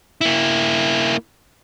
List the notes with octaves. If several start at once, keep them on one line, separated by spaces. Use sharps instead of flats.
A#3 E4